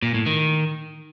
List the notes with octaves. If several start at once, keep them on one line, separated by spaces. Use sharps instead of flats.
A#2
A2
D#3